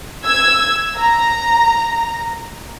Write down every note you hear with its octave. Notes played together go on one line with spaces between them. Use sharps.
E6 G#6
A#5